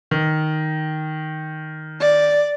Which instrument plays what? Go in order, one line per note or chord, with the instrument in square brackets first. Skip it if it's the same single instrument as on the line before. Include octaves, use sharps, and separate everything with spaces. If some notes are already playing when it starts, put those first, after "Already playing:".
[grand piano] D#3
[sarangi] D5